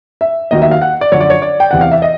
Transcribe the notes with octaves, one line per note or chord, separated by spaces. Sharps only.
E5
D#2 D#3 F#3 D#5
E5
F5
F#5
D5
F#2 D3 F3 C#5
D5
C#5
D5
G5
E2 C3 E3 F#5
F5
E5
D#5